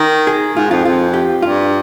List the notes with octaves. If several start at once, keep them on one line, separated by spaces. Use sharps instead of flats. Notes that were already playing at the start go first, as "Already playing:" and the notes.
Already playing: D#3 A#4
G#4
G#2 F4
F2 F4
F2 F4
G4
G2 F4